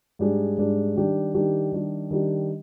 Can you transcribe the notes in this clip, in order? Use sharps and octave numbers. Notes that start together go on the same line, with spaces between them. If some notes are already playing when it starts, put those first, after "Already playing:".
G#2 G3 D4 G#4
G#2 G3 D4 G#4
D#3 G3 D4 G4
D#3 G3 D4 G4
D#3 G3 D4 G4
D#3 G3 D4 G4